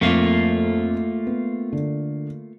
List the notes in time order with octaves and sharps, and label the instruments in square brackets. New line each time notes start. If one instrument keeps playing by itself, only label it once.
[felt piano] F2 [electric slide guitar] A3 A#3 F4
[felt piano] B3
D3